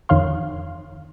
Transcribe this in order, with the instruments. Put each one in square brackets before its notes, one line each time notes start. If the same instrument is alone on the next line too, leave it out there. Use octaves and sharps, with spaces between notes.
[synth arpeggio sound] F2 D#3 C#5 F5 C6